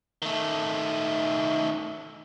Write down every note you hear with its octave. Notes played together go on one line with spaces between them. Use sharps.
D#3 A3